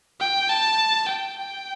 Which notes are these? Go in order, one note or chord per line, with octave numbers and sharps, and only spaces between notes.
G5
A5
G5
G5